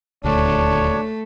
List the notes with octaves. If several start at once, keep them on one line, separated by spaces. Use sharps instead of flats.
D#1 D2 A3 D4 C#5